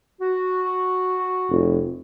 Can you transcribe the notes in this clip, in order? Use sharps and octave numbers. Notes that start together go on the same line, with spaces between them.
F#4
F1